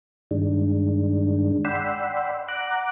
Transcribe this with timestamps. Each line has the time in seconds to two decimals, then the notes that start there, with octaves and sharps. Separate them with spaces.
0.31 G2 D#3 G#3 D4
1.65 D5 F#5 G5 B5 C6 E6
2.49 F#5 A#5 D6 F#6